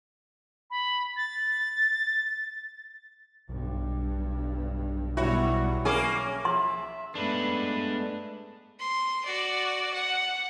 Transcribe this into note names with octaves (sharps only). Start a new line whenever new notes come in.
B5
A6
B1 G2
B2 F#3 G3 E4 F#4 C#5
A#3 C#4 G#4
E5 C6
G#3 A3 B3 D4 B4
C6
F#4 D5
F#5